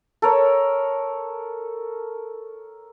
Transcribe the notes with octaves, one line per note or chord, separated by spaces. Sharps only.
A4 A#4 C#5